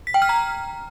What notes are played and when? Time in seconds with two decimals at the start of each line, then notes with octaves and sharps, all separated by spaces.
0.07 B6
0.14 G5
0.22 F6
0.29 A#5